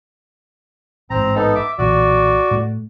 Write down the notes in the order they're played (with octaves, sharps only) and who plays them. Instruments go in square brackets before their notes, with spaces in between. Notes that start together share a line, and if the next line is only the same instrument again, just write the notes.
[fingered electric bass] A1 G#2 [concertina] C4 A#5
[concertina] B3 D#4 A4
E5 D6
[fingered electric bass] B1 A#2 E3 [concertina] F#4 D5
[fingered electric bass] A2 A3